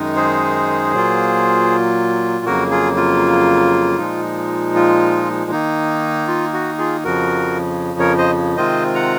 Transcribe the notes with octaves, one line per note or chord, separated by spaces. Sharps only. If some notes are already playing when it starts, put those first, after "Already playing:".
Already playing: F#2 D#3 G#3 D#4
G#4 C5
A#2 F#3 A#3 F4
F2 C#3 F#3 A#3 F#4 A#4
F4 G#4
F4
A#2 F3 G#3 D#4
F4
D#3 A#3 D#4
F4
F#4
F4 G#4
F2 C#3 F3 F#4 A#4
A#4 C#5
C5 D#5
C3 D#3 G#3 C4 F4 C5 D#5
F#5 A#5